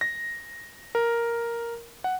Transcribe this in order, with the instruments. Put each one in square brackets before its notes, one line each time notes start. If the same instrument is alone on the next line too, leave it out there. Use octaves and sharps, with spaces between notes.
[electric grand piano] A#6
A#4
F#5